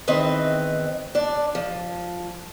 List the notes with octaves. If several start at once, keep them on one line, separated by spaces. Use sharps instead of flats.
E2 D#3 C4 B4 D#5 E5
D4 D5
F3